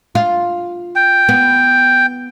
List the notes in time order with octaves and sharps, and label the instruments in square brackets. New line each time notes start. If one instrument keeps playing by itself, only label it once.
[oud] F4
[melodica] G5
[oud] B3